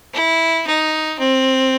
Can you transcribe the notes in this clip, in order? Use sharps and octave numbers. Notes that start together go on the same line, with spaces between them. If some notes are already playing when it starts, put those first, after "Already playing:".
E4
D#4
C4